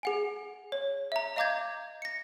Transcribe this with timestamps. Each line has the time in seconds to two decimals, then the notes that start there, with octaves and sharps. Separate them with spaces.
0.03 G#4 F#5 G#5
0.72 C#5
1.12 E5 A#5
1.36 D#5 F5 A#5 D6 G6 G#6
2.02 A#6 C#7